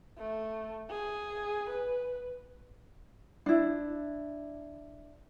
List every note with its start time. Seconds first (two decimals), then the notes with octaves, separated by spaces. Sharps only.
0.18 A3
0.90 G#4
1.70 B4
3.46 D4 E4